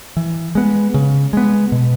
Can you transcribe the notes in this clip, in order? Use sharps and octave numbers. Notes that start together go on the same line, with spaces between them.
E3
G#3 B3
C#3
G#3 B3
B2